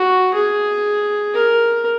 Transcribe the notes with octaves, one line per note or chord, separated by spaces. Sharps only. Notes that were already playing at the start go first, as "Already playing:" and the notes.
Already playing: F#4
G#4
A#4